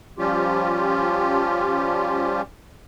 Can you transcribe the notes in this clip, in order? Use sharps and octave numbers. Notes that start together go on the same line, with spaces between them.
F3 G3 C#4 F4 G4